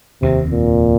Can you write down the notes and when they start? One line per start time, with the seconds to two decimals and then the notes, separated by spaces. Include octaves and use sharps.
0.22 F1 D#2 C3 D#3 C4
0.52 A#2